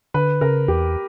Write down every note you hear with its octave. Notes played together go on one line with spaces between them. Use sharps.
D3 B4
C#3 A#4
E2 G4